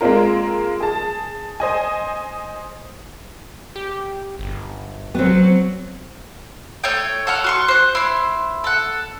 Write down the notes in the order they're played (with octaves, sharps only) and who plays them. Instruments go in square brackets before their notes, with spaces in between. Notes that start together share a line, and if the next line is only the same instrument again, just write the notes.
[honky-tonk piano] G#3 A#3 C4 F4 A#4
G#4 A5
C5 D#5 G#5
[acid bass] G4
G1
[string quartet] F#3 [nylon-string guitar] B3 C4
[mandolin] A3 C#5 G5
A4 F#5 F6
F#4 C6 C#6
C5 F#6
E4 C5
A4 F#5